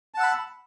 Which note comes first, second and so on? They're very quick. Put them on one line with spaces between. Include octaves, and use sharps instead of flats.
A5 F#5 E6 B5